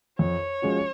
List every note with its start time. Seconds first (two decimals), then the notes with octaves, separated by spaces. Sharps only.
0.19 F2 C#5
0.62 F3 G#3 C#4 F#4